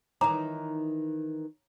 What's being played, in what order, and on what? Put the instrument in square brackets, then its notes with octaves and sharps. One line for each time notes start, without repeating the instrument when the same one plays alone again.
[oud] D#3 E3 D#4 [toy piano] C#5 A#5 D6